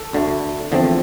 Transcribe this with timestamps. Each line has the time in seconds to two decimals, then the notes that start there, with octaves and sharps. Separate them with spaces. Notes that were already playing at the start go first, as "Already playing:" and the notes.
Already playing: A4
0.13 D2 D3 A3
0.72 E2 D3 F3 A3 C4